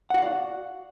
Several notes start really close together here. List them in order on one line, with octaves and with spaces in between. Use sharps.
F#5 F#4 F5 D5